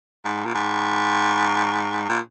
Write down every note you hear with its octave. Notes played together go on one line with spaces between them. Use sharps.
G#2
A#2
G#2
A#2